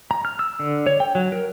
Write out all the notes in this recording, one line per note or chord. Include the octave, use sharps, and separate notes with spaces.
A#5
F6
E6
D3
C#5
G5
F#3
A#4